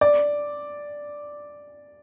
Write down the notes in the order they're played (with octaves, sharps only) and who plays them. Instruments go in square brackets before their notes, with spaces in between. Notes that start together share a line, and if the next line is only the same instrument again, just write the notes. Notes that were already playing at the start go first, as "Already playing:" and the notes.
[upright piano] D5